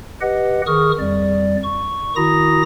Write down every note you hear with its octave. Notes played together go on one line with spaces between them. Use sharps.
G4 B4 D#5 F#5
D#3 G#4 C#6 D#6 F6
F2 G3 D5
C#6
D#3 E4 F#4 A#5 D#6 A#6